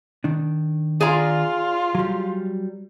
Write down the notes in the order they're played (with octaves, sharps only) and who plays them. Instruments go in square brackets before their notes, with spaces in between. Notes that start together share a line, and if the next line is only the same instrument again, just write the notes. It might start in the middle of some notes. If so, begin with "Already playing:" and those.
[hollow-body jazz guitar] D#3 D4
[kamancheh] F4 [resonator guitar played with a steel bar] G#4 D5 A#5
[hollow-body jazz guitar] F#3 G3